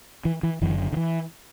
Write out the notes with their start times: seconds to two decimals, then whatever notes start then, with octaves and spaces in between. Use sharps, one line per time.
0.25 E3
0.43 E3
0.61 F#1 F#2 D3 E3
0.93 D3
0.96 E3